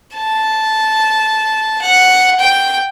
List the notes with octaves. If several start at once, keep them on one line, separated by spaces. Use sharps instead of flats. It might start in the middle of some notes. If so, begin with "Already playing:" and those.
A5
F#5
G5